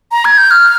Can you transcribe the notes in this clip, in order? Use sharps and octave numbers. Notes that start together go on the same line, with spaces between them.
A#5
G#6
G6
F6